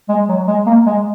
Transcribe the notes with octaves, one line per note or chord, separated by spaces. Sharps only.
G#3
F#3
G#3
A#3
G#3